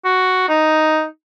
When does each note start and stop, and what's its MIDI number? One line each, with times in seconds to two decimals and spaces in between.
0.05 0.45 66
0.49 1.05 63